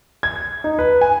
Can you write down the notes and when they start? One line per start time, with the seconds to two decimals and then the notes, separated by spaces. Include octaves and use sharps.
0.23 G#6
0.64 D#4
0.79 B4
1.01 G#5